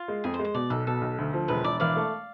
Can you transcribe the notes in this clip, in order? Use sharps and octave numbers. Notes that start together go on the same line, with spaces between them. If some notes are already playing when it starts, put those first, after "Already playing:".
Already playing: F4
G#3
F2 G#4
C5
G#3
C5
B2 D5
B1 A4
B2 A4
B1
D2
F3
E1 B4
E1 D5
E3 D5 F5
A3